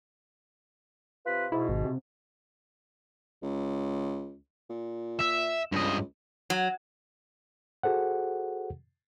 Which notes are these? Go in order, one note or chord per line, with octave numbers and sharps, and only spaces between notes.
C3 F4 B4
G#2 B2 E4
G#1
C3
C#2
A#2
E5
C#2 G2 D#5
F#3
F#4 G#4 A4 C5 F#5